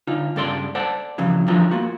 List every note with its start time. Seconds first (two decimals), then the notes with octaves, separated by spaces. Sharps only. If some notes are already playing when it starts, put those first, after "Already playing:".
0.07 D3 D#4 F4
0.36 G2 C#3 A4 D5 C6
0.75 A4 C5 D5 F#5 A5
1.18 F2 C#3 E3 F#3
1.48 D3 E3 F3 G3 F4 A#5
1.71 A#3 F4 F#4